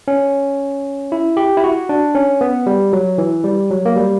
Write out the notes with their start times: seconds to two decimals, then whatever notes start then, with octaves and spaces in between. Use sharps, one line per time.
0.08 C#4
1.12 E4
1.37 G4
1.57 E4
1.64 F#4
1.89 D4
2.15 C#4
2.41 B3
2.66 G3
2.93 F#3
3.18 E3
3.44 G3
3.71 F#3
3.86 A#3
3.96 G3